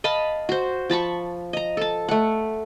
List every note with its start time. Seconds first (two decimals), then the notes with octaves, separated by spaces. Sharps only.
0.04 D#5 F5 A5 B5
0.49 F#4 C5
0.90 F3 A5 B5 C#6
1.53 D#5 A#5
1.77 A4 A5
2.08 A3 F#5